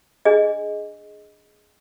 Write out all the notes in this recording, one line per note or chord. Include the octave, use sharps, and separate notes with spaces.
D4 G#4 D#5